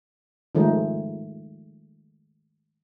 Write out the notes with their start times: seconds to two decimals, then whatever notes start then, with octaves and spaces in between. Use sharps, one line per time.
0.55 D#3 F3 G#3 A3 D#4